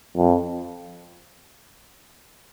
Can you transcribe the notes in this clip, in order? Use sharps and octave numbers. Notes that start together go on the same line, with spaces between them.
F2